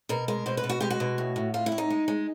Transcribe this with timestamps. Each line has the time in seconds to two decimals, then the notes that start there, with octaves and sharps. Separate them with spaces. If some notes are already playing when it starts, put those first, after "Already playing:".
0.09 B2 A#4
0.28 G#3 A#4
0.46 B2 C5
0.57 B4
0.64 B2
0.69 F#4
0.81 G#3 G4
0.90 F#4
1.00 B2
1.18 A2
1.36 A2
1.54 A2 F4
1.66 E4
1.72 A2
1.78 D#4
1.90 G#3
2.08 G#3